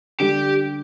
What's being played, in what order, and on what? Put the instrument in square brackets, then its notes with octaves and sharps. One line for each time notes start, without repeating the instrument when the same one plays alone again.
[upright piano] D3 G3 D4 [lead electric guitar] G4